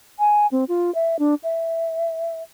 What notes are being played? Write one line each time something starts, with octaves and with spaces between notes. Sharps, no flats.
G#5
C4
F4
E5
D4
E5